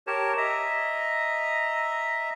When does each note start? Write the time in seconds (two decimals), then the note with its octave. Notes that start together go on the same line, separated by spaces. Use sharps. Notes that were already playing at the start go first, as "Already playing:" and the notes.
0.07 G4 A#4 C#5 A5
0.37 D#5 E5 A#5